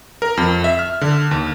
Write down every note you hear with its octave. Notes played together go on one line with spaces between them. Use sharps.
A#4
F2
E5
F6
D3
D#2